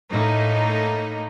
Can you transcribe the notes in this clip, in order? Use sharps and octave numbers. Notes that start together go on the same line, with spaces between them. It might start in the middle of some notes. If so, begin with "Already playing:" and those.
A2 A#3 D#4